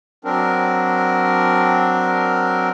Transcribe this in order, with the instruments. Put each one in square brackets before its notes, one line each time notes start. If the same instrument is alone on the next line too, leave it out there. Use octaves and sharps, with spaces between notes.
[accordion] F#3 C4 D4 A#4